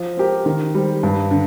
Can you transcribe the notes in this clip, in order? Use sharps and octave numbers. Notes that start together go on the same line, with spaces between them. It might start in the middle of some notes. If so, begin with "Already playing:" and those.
Already playing: F3
C4 G4 A#4
D#3
G3 C4
G2
D3